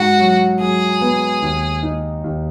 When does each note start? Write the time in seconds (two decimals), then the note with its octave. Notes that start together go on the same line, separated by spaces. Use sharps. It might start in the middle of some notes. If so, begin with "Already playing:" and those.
Already playing: G#2 F#4
0.19 F#3
0.60 F#3 G#4
1.01 B3
1.42 D#2
1.83 D#4
2.24 D#2